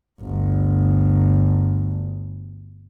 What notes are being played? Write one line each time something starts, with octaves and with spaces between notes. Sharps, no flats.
G1 D2